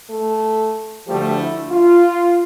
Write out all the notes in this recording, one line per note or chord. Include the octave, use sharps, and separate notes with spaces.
A3 A4
D2 D3 F3 G3 A3 G4
E4
F4